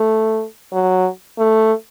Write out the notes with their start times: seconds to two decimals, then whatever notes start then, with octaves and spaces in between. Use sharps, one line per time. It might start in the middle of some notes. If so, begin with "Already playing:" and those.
Already playing: A3
0.72 F#3
1.38 A3